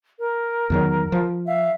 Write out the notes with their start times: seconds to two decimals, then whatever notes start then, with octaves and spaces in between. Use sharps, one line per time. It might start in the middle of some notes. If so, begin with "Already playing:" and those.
0.19 A#4
0.70 E2 D#3 F#3
1.12 F3
1.46 E5 F5